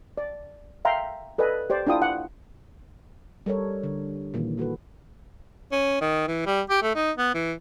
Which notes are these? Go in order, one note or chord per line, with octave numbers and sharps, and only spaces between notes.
D5
E5 F5 G5 A#5 C6
A4 B4 D5 D#5 G#5
G4 C5 D5
D4 E4 F4 G5 D#6
F#5
G3 A4 A#4 C#5
D3
A#2 D#3 E3 A#3
A#3 F#4 A4 B4
C#4
D#3
E3
G3
G4
A3
D#4
B3
E3